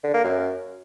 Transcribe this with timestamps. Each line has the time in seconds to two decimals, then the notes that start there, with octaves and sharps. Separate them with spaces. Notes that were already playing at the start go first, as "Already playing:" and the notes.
0.04 D3
0.14 A#3
0.24 F#2